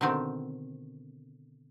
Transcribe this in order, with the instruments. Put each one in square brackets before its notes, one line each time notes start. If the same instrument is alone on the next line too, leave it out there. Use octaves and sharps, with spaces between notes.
[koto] B2 D3 D#3 C4